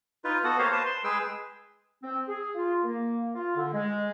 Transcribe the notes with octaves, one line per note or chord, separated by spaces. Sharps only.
D#4 F4 B4
B3 F#4 A4 F#5
A#3 G4 C5 C#5 D#5 F5
B4 C5 A5
C6
G#3 G#4 B4 G5 E6
C4
G#4
F4
A#3
F4
D3
G#3